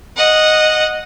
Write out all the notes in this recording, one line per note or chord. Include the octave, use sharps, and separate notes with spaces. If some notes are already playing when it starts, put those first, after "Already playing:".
D#5 F#5